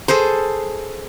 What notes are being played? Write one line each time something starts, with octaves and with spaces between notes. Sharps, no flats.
G#4 A4 B4 C5